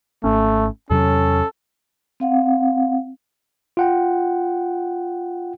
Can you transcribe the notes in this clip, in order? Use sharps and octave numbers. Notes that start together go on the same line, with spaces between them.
G#1 A3 C#4
E2 C3 F#3 C#4 A4
C4 F5 F#5
F4 F#5 G5